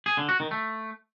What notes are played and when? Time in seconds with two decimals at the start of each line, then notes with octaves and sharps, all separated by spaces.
0.06 G#4
0.17 D3
0.29 F#4
0.40 D#3
0.51 A3